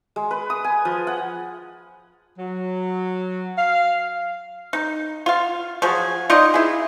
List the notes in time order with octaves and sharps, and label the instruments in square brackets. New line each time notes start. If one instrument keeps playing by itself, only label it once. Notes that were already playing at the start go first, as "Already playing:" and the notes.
[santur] G#3
B4
D#6
G#5
F3
F#5
[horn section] F#3
F5
[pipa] D#4
F4 F5
F3 F#3 G#4
D#4 F4 D5 D#5
E4 G#4